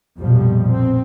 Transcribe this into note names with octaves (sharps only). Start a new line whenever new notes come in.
A#1 F2 B2 F3 G3
C4